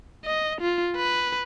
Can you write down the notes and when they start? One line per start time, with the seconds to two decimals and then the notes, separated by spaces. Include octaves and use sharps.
0.25 D#5
0.61 F4
0.96 B4